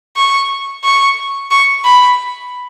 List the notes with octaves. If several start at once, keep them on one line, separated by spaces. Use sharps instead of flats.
C#6
C#6
C#6
B5